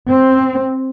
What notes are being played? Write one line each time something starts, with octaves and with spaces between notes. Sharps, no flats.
C4